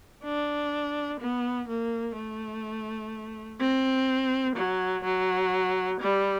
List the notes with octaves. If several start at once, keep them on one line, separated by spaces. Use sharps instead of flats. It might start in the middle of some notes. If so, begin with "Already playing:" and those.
D4
B3
A#3
A3
C4
F#3
F#3
G3